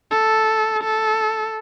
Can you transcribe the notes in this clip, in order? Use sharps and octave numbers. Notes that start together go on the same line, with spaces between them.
A4
A4